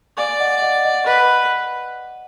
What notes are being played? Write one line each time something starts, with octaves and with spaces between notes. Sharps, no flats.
D5 F5 G#5
D#5 F#5
D#5 F#5
D#5 F#5
B4 D#5 F#5